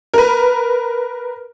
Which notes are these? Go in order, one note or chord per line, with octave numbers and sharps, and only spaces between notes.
A#4 B4